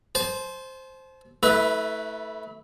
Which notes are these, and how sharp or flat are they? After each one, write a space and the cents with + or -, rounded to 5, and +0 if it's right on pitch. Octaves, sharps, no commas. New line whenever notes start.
C5 +0 A5 -40
A3 +0 E4 -35 B4 +0